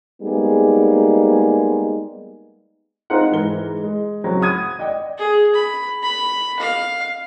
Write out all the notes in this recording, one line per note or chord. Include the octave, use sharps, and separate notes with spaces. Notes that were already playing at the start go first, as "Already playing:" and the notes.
G3 G#3 A#3 B3 D#4 G#4
C4 D#4 F4 A#4 C5 F#5
G#2 E3 A#4 B4 G7
G#3
C#3 F#3 C4
F#5 B5 D#6 G#6 D#7
D5 D#5 F#5 G5
G#4
B5
B5
F5